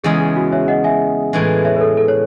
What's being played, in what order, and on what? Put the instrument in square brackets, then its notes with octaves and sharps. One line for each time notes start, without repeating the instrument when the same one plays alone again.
[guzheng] E2 C#3 G#3 [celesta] G#4
[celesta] G#4
F#4
C#5 E5
D#5 F#5
E5 G#5
[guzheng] A2 E3 G#3
[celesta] C#5 E5
B4
A4
A4
C#5